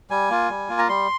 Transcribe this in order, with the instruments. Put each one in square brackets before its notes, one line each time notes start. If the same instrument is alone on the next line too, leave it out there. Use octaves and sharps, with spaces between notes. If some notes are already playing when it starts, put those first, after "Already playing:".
[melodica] G3 G#5
A#3 F4
G3
A#3 F4
A#5
G3 C6